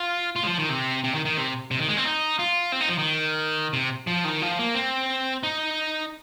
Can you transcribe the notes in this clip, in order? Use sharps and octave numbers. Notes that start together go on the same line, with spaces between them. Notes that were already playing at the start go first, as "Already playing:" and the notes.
Already playing: F4
F4
G#3
F3
D#3
C3
C3
D#3
D#3
C3
C3
D#3
G#3
C4
D#4
F4
C4
D#4
F3
D#3
C3
F3
D#3
F3
A#3
C4
D#4